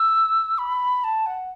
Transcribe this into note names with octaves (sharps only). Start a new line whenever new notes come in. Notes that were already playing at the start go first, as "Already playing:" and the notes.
Already playing: E6
B5
A5
F#5